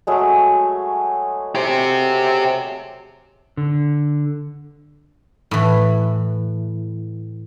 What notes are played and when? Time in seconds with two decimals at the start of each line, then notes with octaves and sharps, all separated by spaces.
0.07 F#3 G#3 A3
1.55 G4 C5
3.57 D3
5.51 A2 E3